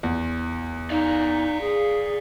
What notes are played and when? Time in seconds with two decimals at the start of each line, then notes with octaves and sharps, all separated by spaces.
0.03 E2
0.90 D#4 D5 F5
1.61 G#4